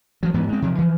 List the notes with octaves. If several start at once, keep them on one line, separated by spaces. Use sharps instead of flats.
F3 F#3
G#2 E3 B3
G#3 C4
C3 F3
E3 F3